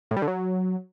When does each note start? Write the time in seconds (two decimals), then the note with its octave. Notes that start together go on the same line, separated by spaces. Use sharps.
0.11 A2
0.17 G3
0.22 D3
0.28 F#3